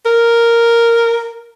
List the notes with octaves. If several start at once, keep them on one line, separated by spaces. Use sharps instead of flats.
A#4